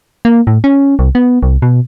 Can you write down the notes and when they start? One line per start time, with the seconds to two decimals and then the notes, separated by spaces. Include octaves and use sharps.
0.25 A#3
0.47 A2
0.64 C#4
0.99 C2
1.15 B3
1.43 C2
1.62 B2